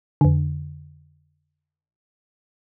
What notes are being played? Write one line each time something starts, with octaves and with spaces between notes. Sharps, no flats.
F2 D3